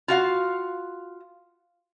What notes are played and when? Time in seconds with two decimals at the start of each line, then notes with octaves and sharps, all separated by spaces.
0.08 F4 F#4 F5